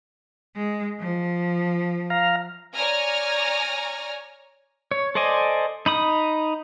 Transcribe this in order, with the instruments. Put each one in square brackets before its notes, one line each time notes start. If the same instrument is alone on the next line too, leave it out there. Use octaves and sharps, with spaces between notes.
[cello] G#3
F3
[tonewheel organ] F5 A#5
[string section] C#5 D5 G#5 A#5 F6 A#6
[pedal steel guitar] C#5
A4 C5 D5 D#5 G#5
D#4 B5 D#6